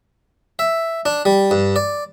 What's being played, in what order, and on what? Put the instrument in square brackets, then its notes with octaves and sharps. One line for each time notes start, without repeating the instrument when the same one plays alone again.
[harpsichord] E5
D4
G3
G2
D5